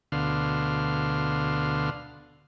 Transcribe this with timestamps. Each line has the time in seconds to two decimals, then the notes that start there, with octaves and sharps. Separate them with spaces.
0.12 D2 B2 D3 F5 C6